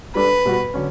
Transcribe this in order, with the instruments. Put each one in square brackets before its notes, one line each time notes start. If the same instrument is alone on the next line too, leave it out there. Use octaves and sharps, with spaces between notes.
[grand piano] G3 D4 A4 [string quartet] B4
[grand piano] B2 G3 B3 F#4
D3 F#3 C#4